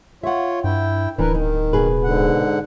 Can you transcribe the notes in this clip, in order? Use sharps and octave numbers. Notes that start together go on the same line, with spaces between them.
F4 C#5 E5 F#5
G2 E4 G5
D1 E3 D4 A#4 B4
D#3 D#4
B2 G#4 B4
G#2 D3 F#5